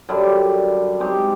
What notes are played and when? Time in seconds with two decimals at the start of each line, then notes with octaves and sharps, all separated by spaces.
0.09 F#2 D3 G3
1.00 G#3 C4 D#4 G4